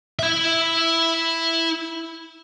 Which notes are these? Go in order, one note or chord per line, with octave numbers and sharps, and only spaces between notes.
E4 E5